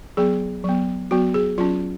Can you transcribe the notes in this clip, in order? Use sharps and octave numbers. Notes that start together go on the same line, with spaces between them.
F#3 B3 G#4
F#3 B3
F#3 B3 F#4
G#4
F#3 C#4 F4